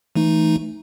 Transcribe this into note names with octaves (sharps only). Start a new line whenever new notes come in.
E3 A3 D#4